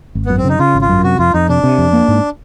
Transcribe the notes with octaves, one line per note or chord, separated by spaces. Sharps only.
G#1
F#2 B3
C4
C#3 D#4
C#3 F4
G#1
F4
F#2
C3 F#4
F2 F4
F2 D#4
C3 D4
C3
F2
A#3
G#2